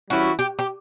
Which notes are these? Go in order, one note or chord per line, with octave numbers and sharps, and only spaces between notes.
E3 G3 C#4 E4 F#4
G4
G4